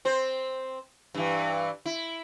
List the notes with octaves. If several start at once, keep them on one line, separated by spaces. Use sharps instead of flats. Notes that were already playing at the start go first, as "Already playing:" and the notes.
C4 C5
G2 E3
E4